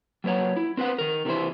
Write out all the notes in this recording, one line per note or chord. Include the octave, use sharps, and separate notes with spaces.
F#3 A#3 B4 C#5 F#5
E4
C4 B4 C5 F#5
D#3 A#4
C3 E3 F#3 E4 C5